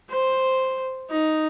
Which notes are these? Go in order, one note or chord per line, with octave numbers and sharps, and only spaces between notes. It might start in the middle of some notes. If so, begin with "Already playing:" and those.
C5
D#4